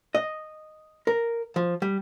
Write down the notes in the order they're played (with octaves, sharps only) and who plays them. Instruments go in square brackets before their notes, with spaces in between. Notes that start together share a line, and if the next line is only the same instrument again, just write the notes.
[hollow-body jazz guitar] D#5
A#4
F3
G3